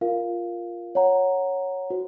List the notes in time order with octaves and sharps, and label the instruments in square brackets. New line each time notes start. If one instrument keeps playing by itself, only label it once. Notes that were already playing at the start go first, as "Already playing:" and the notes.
[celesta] F4 A#4 F5
C#5 F#5 A#5
F#4 C5